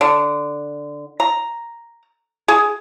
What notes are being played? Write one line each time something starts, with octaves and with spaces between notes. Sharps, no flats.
D3
A#5
G#4